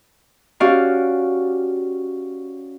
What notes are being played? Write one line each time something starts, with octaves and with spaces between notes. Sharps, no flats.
C#4 F#4 G4 D5 F5